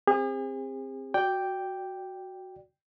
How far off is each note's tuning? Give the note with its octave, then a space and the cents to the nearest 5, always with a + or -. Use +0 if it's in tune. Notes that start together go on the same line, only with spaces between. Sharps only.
C4 +10 G#4 -45
F#4 +0 D5 +0 G5 +0